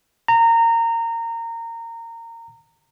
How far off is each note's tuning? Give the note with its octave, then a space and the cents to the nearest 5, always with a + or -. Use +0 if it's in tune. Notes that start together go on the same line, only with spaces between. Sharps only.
A#5 -20